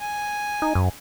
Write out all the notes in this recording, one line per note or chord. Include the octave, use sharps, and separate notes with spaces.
G#5
D#4
F#2